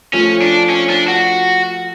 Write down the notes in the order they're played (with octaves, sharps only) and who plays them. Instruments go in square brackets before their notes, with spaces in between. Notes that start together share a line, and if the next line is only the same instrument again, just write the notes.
[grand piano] F3 A3 F4 [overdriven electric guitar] C#4
[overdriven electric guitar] D4
C#4
D4
F#4